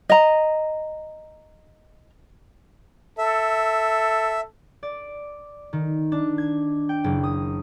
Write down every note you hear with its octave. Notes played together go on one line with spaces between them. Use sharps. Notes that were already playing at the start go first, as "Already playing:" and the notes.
D#5 A#5
A4 E5
D5
D#3
D4
G#6
G5
F#1
D#6